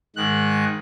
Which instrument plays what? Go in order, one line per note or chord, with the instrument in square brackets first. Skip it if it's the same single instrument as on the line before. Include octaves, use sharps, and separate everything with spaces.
[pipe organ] G#2 D#3 F#6